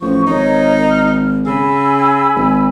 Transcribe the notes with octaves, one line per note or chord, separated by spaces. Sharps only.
A1 F3 C#6
G#1 D#4 A#4 C#5 D#5
F6
C#3 G#5 B5 E6
G#1